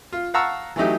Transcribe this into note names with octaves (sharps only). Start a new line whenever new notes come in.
F4
F5 F#5 A5 A#5 C#6 E6
E3 F#3 A3 D#4 G4